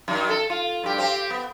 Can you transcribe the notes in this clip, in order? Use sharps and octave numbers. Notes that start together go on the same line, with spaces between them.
F#2 D#3
A4
F4
G2 G4
C4 G4
B3